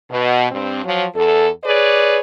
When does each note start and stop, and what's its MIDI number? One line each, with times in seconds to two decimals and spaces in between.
0.11 0.47 47
0.51 0.81 43
0.51 0.81 60
0.85 1.05 53
0.85 1.05 54
1.15 1.49 40
1.15 1.49 69
1.65 2.20 68
1.65 2.20 71
1.65 2.20 73
1.65 2.20 74